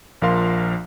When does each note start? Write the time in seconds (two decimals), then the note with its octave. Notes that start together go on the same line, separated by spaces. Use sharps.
0.22 A#1 F3 A#4 F5 C6